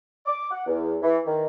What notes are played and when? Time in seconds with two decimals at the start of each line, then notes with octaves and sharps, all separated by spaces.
0.26 D6
0.50 F#5
0.67 E2
1.02 E3
1.25 D#3